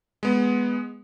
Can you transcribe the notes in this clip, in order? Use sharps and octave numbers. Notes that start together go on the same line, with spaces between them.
G#3 B3